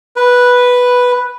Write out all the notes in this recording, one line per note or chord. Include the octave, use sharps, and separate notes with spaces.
B4